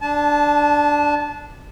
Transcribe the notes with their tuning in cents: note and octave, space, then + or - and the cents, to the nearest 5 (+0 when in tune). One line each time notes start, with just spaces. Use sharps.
D4 +0 A5 -25